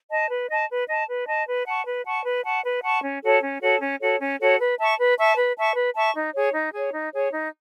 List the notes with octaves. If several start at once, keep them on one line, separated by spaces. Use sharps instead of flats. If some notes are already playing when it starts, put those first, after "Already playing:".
D#5 A5
B4
D#5 A5
B4
D#5 A5
B4
D#5 A5
B4
F#5 A5 C#6
B4
F#5 A5 C#6
B4
F#5 A5 C#6
B4
F#5 A5 C#6
C#4
F#4 A4 C#5
C#4
F#4 A4 C#5
C#4
F#4 A4 C#5
C#4
F#4 A4 C#5
B4
E5 A5 C#6
B4
E5 A5 C#6
B4
E5 A5 C#6
B4
E5 A5 C#6
D#4
G#4 C#5
D#4
G#4 C#5
D#4
G#4 C#5
D#4